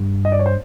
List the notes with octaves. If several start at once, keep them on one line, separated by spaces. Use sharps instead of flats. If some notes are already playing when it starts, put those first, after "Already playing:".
Already playing: G2
D#5
D5
C#5
C5